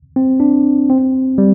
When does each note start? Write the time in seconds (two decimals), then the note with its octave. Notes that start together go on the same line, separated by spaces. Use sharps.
0.16 C4
0.40 D4
0.90 C4
1.38 G3